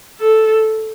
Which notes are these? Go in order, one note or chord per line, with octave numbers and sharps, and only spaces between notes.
A4